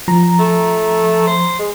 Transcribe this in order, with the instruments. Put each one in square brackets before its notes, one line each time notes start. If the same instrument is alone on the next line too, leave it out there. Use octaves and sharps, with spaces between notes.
[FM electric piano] F3 A#5
[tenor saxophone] A3
C5
G#3